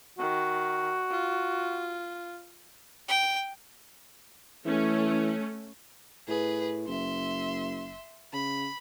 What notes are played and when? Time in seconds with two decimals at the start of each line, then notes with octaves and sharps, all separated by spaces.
0.19 D#3 F#4
1.11 F4
3.08 G5
4.65 E3 A3 C#4
6.28 A2 G#4 B4
6.87 F#1 E5 C6
8.33 C#3 B5